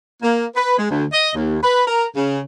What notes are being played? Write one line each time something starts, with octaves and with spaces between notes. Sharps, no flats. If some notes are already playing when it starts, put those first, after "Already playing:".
A#3
B4
G#3
D2
D#5
D#2
B4
A#4
C#3